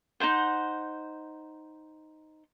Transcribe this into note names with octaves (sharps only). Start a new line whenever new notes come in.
D#4 F4 C5 F#5